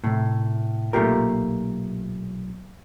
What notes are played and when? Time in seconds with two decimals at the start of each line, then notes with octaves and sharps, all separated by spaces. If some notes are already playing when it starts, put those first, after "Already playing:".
0.04 A2 C3
0.93 B1 A#2 A3 F4 G4 A#4